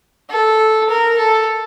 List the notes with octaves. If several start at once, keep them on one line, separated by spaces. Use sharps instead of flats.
A4
A#4
A4